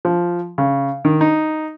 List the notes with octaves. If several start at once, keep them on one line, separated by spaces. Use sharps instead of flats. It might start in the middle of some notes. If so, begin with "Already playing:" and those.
F3
C#3
D#3
D#4